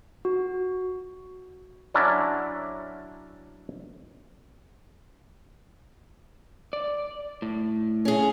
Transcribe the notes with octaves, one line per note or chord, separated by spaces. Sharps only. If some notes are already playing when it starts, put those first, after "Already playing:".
F#4
F#3 C#4 D4 E4 A#4 E5
D5
A2
C#4 G#4